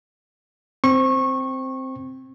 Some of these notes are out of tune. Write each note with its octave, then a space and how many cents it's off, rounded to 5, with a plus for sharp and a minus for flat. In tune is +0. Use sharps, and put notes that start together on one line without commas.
C4 +0 C#6 -25